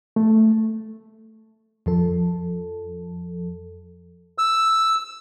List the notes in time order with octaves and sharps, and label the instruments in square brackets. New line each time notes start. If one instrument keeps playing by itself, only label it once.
[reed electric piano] A3
[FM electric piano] F2 F3 A4
[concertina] E6